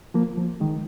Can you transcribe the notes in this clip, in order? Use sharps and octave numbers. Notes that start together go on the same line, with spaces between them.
F3 A#3
F3
D#3 G#3